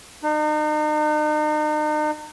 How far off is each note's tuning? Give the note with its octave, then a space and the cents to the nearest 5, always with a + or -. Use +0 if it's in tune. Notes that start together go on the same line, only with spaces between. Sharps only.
D#4 -40